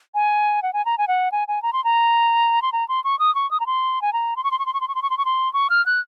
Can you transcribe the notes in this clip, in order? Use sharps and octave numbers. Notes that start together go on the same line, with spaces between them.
G#5
F#5
G#5
A#5
G#5
F#5
G#5
G#5
A#5
C6
A#5
C6
A#5
C6
C#6
D#6
C#6
D#6
A#5
C6
G#5
A#5
C6
C#6
C6
C#6
C6
C#6
C6
C#6
C6
C#6
C6
C#6
C6
C#6
F6
F#6